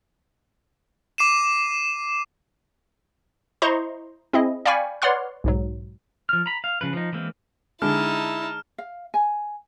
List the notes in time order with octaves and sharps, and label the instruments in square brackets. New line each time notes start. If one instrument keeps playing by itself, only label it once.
[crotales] D6 C7 D#7 E7
[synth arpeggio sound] E4 C5 D#5 A#5 C6 C#6
C4 E4 G#4 D#5
D5 F5 G5 G#5 B5 C#6
B4 C#5 D5 F#5 C6 F6
B1 G#2 F#3
[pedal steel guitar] F3 F6
A#5 B5
F5
C#3 F3 B4
F3 D#4
E3 G#3 A#3 C4
[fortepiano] D3 G#3 [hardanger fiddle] D#4 A5 [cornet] E4 [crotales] F6
[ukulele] F5
G#5